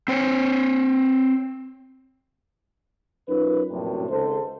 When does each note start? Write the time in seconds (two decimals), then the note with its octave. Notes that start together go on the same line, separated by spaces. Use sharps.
0.08 C4 C5 C#5
3.29 F#2 D#4 F4 A#4 B4
3.70 A#1 F#2 A2 C3
4.09 G#1 C#2 A4 C5